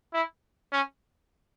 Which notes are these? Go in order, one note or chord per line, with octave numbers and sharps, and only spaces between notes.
E4
C#4